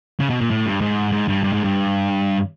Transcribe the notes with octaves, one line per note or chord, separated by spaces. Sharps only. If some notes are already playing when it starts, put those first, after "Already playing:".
C#3
B2
A#2
A2
G2
G#2
G#2
G2
G2
G#2
G2